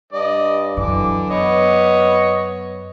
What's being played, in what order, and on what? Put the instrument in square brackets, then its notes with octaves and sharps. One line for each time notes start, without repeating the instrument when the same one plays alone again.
[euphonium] G2 [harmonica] D5 D#5
[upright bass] F#2 [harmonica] D3 D6 [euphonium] E3
[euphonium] B3 [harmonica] B4 C#5 D#5